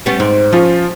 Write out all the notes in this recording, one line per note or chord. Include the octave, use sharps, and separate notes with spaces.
G3 B3 C#4
G#2 C4
F3 C#4 F4